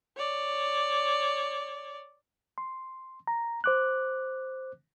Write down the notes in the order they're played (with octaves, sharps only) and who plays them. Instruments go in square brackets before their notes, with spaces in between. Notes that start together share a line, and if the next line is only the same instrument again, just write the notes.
[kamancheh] C#5 D5
[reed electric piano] C6
A#5
C5 D6 F#6